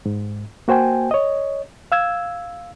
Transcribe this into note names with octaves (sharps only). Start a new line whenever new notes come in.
G#2
A#3 F#4 C5 G5 G#5
C#5 D#5
F5 E6 G#6